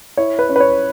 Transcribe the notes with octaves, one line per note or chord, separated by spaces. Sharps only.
E4 C#5
B4
C#4
B4
C#5